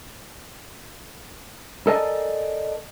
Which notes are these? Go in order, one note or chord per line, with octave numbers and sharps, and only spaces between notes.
A4 A#4 D5 D#5 G#5 A5